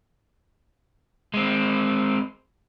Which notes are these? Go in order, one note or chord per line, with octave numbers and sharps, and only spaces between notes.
G#3 C4